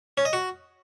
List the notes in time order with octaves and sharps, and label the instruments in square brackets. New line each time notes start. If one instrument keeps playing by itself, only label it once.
[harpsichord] C#4
D#5
F#4